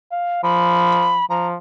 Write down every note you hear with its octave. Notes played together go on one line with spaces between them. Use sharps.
F5
F3 B5
F3 A#5